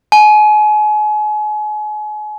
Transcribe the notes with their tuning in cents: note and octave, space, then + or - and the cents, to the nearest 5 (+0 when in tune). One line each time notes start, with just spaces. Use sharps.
G#5 +35